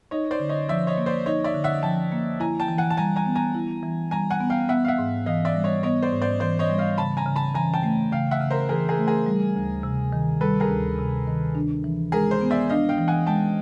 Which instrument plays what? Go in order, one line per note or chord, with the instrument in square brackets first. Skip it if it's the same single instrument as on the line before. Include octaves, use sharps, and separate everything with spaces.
[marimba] D#4 [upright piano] C#5 D#5
[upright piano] C5 D5
[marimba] D3
[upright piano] C#5 D#5
[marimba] F3 [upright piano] D5 E5
[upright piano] C#5 D#5
[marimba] A#3
[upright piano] C5 D5
[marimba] D#4 [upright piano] C#5 D#5
[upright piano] D5 E5
[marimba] D3
[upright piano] E5 F#5
[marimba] F3 [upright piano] G5 A5
[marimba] A#3
[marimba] E4 [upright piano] G#5 A#5
[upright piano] G5 A5
[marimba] E3
[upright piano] F#5 G#5
A5
[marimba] G3 [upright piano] G#5 A#5
[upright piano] G#5 A#5
[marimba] B3
[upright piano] G#5 A#5
[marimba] E4
E3
[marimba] G3 [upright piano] G#5 A#5
[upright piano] F#5 G#5
[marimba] B3
[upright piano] F5 G5
[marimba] B3 [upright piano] E5 F#5
[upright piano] F5
E5 F#5
[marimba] G#2
[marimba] E3 [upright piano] D#5 F5
[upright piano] D5 E5
[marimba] G3
[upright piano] C#5 D#5
[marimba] B3 [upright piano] C#5 D#5
[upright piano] C5 D5
[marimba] G#2
[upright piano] C5 D5
[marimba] E3 [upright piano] C5 D5
[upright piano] C#5 D#5
[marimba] G3
[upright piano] D#5 F5
[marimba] C#3 [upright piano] A5 B5
[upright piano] G#5 A#5
[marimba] C#3
[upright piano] A5 B5
[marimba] E3 [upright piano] G#5 A#5
[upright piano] G5 A5
[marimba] A3
[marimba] C#3 [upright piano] F5 G5
[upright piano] E5 F#5
[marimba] C#3
[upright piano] A#4 C5
[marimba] E3 [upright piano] G#4 A#4
[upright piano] G#4 A#4
[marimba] A3
[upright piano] G#4 A#4
[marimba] G3
D2
C3
D#3
[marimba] G3 [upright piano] A4 B4
[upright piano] G#4 A#4
[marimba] D2
C3
D#3
D4
E3
[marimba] G#3 [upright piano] G#4 A#4
[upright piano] A#4 C5
[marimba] B3
[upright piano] D5 E5
[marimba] D4 [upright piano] D#5 F5
[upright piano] F5 G5
[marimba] E3
[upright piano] F#5 G#5
[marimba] G#3 [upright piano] G5 A5